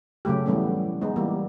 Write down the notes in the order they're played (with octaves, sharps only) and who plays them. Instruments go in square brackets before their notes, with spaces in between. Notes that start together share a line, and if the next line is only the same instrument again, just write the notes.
[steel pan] C#3 F#3 A3 G4
E3 G3 A3 B3 C#4
G#3 B3 D#4
E3 G3 A#3